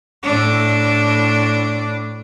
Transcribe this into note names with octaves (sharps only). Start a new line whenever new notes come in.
A2 D4